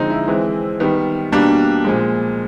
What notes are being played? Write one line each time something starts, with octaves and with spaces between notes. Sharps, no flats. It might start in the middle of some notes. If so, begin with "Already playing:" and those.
Already playing: D3 F3 G#3 C4 D#4
E4
E3 G#3 C4
D#3 G3 B3
B2 G3 A#3 D4
A#2 F3 G#3